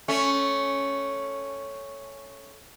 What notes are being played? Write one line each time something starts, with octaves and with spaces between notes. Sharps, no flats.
A3 C#4